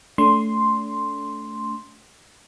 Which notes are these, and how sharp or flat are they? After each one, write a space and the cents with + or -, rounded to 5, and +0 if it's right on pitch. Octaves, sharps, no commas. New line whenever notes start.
A3 +0 D4 -40 C6 +0